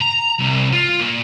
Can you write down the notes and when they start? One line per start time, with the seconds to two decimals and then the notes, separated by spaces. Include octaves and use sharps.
0.02 A#5
0.40 C2
0.73 F4
1.00 A#2